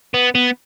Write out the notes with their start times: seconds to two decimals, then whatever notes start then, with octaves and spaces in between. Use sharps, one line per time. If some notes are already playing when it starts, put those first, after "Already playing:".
0.14 B3
0.35 B3